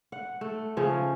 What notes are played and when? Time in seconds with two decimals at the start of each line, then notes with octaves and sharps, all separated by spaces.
0.12 F#5
0.41 A3
0.77 C#3 F3 C#4